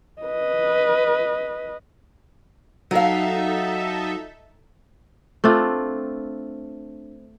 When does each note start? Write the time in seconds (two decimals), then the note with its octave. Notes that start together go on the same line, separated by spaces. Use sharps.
0.22 B4 D#5
2.91 F#3 D#4 A4 E5 F5
5.44 A3 C4 D4 F4